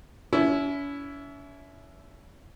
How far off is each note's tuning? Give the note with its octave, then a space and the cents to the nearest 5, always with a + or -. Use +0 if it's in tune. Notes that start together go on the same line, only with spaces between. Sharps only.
C#4 +40 E4 +0